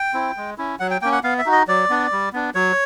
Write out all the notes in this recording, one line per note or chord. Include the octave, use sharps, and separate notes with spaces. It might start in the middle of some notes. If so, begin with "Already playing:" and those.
Already playing: G5
C4 E4
G#3
C#4 E4
F#3 F#5
G5
A#3 C#4 G5
F#5
B3 F5
E5
D#4 F#4
D#5
F#3 D5
B3 D4
G3
B3 D4
F#3 C#5